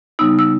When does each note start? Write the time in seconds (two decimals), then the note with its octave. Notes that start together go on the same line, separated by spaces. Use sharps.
0.19 C#3 G3 B3 D#4 E6
0.39 E6